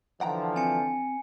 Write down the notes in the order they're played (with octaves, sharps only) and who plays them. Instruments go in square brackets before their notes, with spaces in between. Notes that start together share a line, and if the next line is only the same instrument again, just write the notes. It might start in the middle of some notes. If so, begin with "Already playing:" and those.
[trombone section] D3 E3 F3 [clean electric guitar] F#5 G5 A#5
[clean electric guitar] C4 [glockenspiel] G#5 C#7